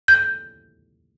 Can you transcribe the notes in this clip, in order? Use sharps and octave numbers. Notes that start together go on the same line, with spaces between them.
G6